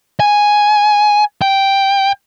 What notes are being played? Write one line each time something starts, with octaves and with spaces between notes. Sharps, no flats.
G#5
G5